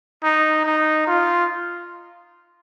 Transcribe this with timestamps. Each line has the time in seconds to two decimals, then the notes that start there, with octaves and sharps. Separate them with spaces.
0.23 D#4
0.65 D#4
1.07 F4